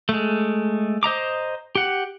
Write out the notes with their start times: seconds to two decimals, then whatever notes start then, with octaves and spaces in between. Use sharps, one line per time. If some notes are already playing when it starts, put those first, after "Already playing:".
0.09 G#3 A3
1.03 C5 D#5 A#5 D6
1.75 G4 F#5